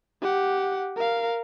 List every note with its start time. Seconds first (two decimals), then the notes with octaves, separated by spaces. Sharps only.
0.21 G4 F#5
0.96 A#4 F5